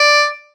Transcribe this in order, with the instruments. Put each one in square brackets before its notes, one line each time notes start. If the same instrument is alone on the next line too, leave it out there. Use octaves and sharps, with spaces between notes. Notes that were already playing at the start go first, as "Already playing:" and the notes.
Already playing: [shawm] D5